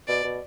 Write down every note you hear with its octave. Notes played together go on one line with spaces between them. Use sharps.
B2 D5
B2